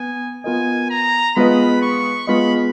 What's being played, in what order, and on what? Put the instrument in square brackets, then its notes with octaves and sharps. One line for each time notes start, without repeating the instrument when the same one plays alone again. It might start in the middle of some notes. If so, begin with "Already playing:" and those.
Already playing: [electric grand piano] B3 [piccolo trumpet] G#5
[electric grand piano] B3 F4 A#4 D#5 [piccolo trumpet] G#5
[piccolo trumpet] A#5
[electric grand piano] G#3 B3 F4 B4 D#5 [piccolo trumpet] B5
[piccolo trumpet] C#6
[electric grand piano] G#3 B3 F4 B4 D#5 [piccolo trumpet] B5